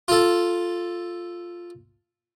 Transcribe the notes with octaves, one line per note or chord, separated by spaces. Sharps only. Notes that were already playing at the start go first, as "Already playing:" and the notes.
F4 A4